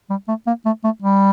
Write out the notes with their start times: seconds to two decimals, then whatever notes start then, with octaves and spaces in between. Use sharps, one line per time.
0.10 G3
0.28 A3
0.47 A#3
0.65 A3
0.84 A3
1.02 G3